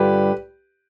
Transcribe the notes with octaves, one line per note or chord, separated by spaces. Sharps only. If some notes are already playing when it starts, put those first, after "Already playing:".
Already playing: G2 D3 G3 D4 F4 G4 B4